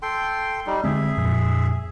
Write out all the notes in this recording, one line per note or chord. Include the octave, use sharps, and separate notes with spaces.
A4 G5 C6
G3 D#4
D3 G#3 C4 G#4 E5
F2 A#2 F3